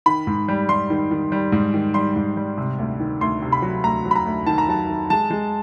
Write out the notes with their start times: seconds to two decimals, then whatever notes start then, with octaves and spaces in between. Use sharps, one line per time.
0.06 D#3 B5
0.27 G#2
0.48 G3
0.69 G3 C6
0.90 D#3
1.11 D#3
1.32 G3
1.52 G#2
1.74 D#3
1.94 G3 C6
2.16 G#2
2.37 G3
2.58 C3
2.78 D2
3.00 D#3
3.21 D2 C6
3.42 C3
3.52 B5
3.62 F#3
3.84 D2 A#5
4.05 F#3
4.11 B5
4.15 A#5
4.26 D2
4.46 D#3 A5
4.58 A#5
4.68 F#3 A5
4.89 D#3
5.10 G#3 A5
5.30 G#3